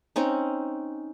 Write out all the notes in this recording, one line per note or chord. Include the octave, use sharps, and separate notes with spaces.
C4 C#4 D#4